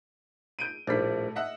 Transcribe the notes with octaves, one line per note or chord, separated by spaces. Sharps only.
G6 D7 D#7
A#1 A2 G3 B6
D#5 E5 F#5